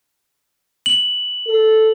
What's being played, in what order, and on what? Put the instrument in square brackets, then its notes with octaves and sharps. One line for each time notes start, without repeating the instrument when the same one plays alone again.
[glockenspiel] F#7
[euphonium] A4